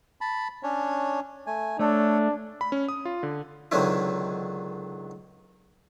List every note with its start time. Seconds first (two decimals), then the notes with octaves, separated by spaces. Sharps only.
0.21 A5 B5
0.63 C#4 D4 C#5
1.47 A3 G#5
1.79 A3 D4 A4 C#5
2.61 B5
2.72 C#4
2.88 D#6
3.05 F4
3.23 D3
3.71 C#2 D3 D#3 F#3 C4 E4